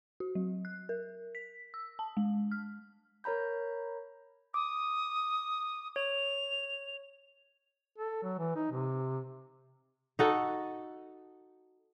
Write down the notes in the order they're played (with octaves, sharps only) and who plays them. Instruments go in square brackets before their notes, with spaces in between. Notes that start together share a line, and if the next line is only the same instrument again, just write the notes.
[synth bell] F#4
F#3
F#6
A#4
B6
E6
A5
G#3
F6
[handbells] A#4 C#5 A#5 B5 G6
[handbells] D6 [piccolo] D#6
[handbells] C#5 [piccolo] F7
[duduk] A4
F#3
E3
D#4
C3
[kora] D#4 F#4 A4